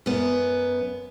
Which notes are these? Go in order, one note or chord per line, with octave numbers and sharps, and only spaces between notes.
F#2 B3